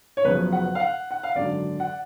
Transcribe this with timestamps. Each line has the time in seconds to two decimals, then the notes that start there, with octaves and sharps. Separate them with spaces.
0.17 C#5
0.25 F#1 F#2 C#3 F3 B3 B4
0.52 F#5
0.75 F5
0.80 F#5
1.11 F#5
1.23 F5
1.35 G#1 F#2 D3 D5
1.80 F#5